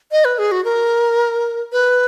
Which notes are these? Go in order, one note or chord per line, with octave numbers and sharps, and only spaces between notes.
D#5
B4
G#4
F#4
A#4
B4